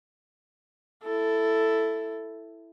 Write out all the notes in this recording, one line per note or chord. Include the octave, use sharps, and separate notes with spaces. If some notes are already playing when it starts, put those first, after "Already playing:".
E4 A4